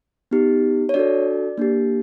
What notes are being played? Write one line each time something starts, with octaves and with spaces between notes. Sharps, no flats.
B3 D#4 G4
C#5
D4 F#4 A4 D5
A#3 D4 G4